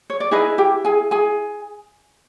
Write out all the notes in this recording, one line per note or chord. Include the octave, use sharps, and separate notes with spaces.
C#5
D5
D#4 E4 G#4 B4 D#5
G4 G5
G#4 G#5
G#4 G#5